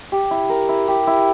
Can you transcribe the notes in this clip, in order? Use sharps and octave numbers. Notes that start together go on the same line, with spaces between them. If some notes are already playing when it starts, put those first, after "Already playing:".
G4
E4
A#4
E4
G4
E4